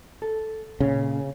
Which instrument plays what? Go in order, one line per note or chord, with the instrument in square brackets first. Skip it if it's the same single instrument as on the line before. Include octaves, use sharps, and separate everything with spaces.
[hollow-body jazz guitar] A4
[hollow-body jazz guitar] A#2 C#4 [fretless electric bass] C#3